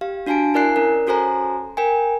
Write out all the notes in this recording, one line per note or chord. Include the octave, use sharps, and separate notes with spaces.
G4 F5
D4 F#4 F5 G#5 A5 D7
E4 A#4 D5 G#5 F#6 C7
C#4 A#4
C#4 F#4 A4 C5 G#5 A#5
A#4 G5 G#5